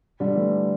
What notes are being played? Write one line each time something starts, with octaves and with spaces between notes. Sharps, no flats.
D3 G3
E3 A3